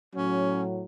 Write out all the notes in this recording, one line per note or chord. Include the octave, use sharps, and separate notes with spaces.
A2 F#3 C#4